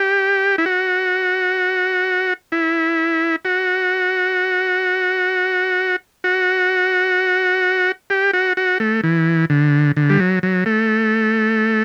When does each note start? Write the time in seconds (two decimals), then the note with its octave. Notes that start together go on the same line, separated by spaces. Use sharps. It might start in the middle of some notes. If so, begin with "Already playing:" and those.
Already playing: G4
0.58 E4
0.66 F#4
2.52 E4
3.45 F#4
6.24 F#4
8.10 G4
8.33 F#4
8.57 F#4
8.80 A3
9.03 E3
9.50 D3
9.97 D3
10.10 G3
10.19 F#3
10.43 F#3
10.66 A3